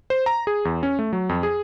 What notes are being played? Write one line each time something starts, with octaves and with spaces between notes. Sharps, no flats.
C5
A#5
G#4
E2
C#4
A3
F#3
F2
G#4